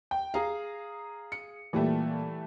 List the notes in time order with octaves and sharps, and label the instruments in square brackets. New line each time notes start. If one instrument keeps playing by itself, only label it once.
[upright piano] G5
[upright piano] G#4 F5 [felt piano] A#5
[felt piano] C#7
[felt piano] A#2 [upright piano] E3 G3 A3